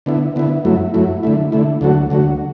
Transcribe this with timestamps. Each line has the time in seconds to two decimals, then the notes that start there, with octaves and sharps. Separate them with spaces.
0.06 D3 B3 E4
0.36 D3 B3 E4
0.65 F#2 F#3 A3 E4
0.94 F#2 F#3 A3 E4
1.23 D3 A3 E4
1.52 D3 A3 E4
1.81 D2 D3 F#3 A3 F#4
2.10 D2 D3 F#3 A3 F#4